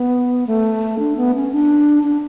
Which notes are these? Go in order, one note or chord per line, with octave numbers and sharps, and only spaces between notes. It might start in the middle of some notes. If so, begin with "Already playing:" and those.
Already playing: B3
A3
D4
B3
C#4
D4
D4